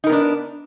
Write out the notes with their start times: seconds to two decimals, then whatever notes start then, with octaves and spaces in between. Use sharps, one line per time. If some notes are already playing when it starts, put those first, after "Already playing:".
0.04 D#4
0.07 A#4
0.09 B3
0.12 D4